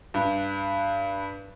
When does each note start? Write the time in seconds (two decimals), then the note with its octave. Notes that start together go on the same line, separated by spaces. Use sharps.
0.14 G2